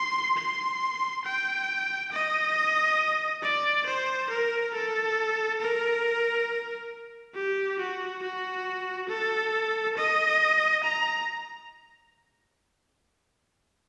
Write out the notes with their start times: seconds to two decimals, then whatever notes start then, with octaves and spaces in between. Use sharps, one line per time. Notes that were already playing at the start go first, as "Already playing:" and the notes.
Already playing: C6
0.37 C6
1.24 G5
2.12 D#5
3.42 D5
3.86 C5
4.30 A#4
4.73 A4
5.60 A#4
7.35 G4
7.79 F#4
8.22 F#4
9.09 A4
9.97 D#5
10.83 A#5